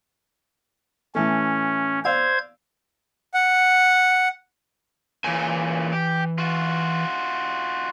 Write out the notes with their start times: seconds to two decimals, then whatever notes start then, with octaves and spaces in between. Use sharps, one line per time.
1.15 A2 E3 A3 C#4
2.05 C5 D5 F5 E6 G#6
3.34 F#5
5.24 A#2 C#3 E3 G#5
5.93 G4
6.38 F4 F#4